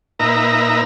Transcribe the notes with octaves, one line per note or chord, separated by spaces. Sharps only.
A#2 D#4 B4 E5 A#5